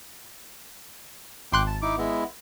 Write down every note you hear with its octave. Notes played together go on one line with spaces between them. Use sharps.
G#1 G5 C6 D6 F#6
A5
D#4 E4 D6
G#3 B3 E4